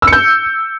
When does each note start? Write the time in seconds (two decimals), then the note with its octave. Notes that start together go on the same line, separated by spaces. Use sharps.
0.02 E6
0.07 C#7
0.13 G6